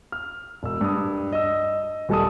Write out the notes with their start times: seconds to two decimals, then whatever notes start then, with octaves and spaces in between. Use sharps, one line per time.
0.12 F6
0.63 E1 E6
0.81 G2 D#6
1.32 D#5 E6
2.09 D#1 G3 A4 A5 D#6